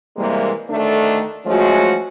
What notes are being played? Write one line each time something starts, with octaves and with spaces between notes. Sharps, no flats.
C3 E3 G3 G#3 A#3
D2 D#3 A3 D4 A4
F3 F#3 G#3 A3 C#4 F#4